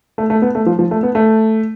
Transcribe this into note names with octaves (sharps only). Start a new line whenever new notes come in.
A3
A3
B3
A3
F3
F3
A3
B3
A3